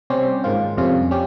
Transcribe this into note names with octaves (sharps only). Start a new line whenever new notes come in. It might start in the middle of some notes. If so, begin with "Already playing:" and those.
C3 G3 C#4 G4 C5
G#2 D#3 A#3 F4
F2 C3 G3 C#4 F4
G3 C#4 G4